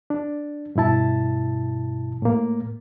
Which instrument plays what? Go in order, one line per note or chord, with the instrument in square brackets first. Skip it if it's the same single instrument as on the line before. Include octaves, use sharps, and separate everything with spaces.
[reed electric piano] D4
G2 B2 E4 A5
A2 A#3